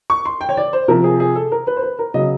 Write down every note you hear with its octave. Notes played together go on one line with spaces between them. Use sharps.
C#6
C6
G5
C#5
D5
C5
C3 F3 A#4
G#4
G#4
A4
A#4
B4
C5
B4
A#4
C#3 F#3 D#5